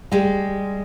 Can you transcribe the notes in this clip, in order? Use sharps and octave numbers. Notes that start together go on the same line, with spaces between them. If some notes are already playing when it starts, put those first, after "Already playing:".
G3 G#3